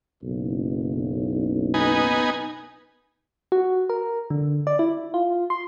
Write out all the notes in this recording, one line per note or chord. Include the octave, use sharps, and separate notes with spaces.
F#1 B1
B3 D#4 G#5
F#4
A#4
D3
D5
E4
F4
C6